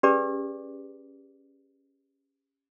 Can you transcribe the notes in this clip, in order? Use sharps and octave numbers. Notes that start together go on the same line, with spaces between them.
C#4 G4 G#4 B4 D5 D6